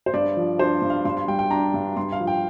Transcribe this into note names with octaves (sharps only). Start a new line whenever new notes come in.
C5
G2 D5
F3
D4 C5
G2
F5
G2 C6
C6
G3 G5
G5
D4 A#5
G2
G2 C6
F5
F3
G5